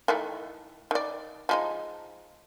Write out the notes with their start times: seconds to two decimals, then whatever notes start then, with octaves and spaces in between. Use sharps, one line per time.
0.08 D#3 E3 A3
0.91 D#3 D5
1.49 F3 G#3 D#4